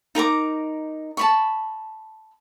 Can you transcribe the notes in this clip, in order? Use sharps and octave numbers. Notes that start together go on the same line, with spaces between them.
D#4 A#4 A#5 D6
A5 B5 C#6